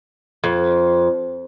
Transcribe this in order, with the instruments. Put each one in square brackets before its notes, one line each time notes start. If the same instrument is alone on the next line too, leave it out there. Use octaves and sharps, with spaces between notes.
[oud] F2